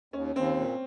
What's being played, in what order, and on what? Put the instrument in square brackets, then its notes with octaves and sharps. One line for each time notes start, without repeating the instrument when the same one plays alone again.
[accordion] D#2 [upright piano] C#4
[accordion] D#2 [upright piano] C4
[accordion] A#2